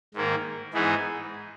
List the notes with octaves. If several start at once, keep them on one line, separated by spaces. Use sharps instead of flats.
G#2 D#3 A#3
G#2 E3 B3 D#4 G#4